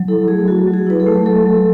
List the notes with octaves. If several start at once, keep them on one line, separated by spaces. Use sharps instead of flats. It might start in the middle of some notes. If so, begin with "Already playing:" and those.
Already playing: F#3
E4 A4
A3 G#4
F#3 F#4
F#3
G#4
E4 B4
A4
A3
F#3 A4
F#3